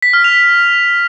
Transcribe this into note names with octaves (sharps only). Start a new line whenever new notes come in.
B6
F6
F7